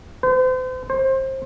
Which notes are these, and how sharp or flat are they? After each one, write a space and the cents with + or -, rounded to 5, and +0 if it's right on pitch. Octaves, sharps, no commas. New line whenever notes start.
C5 -40
C5 +25